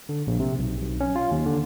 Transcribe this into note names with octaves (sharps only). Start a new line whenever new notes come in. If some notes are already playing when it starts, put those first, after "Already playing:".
D3
A#1
C3
B1
B1
C#4
F4
D#2
D3